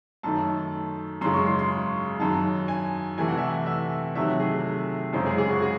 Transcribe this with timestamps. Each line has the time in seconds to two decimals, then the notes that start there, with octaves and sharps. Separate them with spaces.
0.23 F#2 D#3 A3 A5
1.21 F#2 C#3 G#3 C6
1.34 C#6
1.46 C6
1.59 C6
2.20 F#2 D#3 F#3 A5
2.68 G#5
3.18 C3 E3 A3 G#5
3.28 F#5
3.38 E5
3.47 F#5
3.66 E5
4.15 C3 D#3 F#3 A3 E5
4.40 G#4
5.13 F#2 C#3 G#3 C5
5.26 G#4
5.38 G#4
5.51 F#4
5.62 G#4